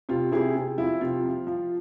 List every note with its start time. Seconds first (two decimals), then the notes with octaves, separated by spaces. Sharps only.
0.09 C3 F4
0.31 C3 E4 G#4
0.55 C3
0.78 F3 E4
1.01 C3 F4
1.24 F3
1.47 F3